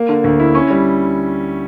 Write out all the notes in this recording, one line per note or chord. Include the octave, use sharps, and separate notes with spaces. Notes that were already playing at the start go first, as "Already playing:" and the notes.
Already playing: A#3
D3
D2
E4
C#4
G3